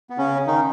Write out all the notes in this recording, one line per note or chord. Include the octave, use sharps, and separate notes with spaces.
B3
C#3 C#4
D#3 D#4